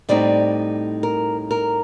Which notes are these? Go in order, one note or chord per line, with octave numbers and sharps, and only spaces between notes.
A2 G3 C4 D#4 D5
A#4
A#4